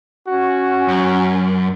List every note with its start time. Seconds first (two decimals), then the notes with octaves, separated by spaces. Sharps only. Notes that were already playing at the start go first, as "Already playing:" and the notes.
0.28 C#4 F#4
0.88 F#2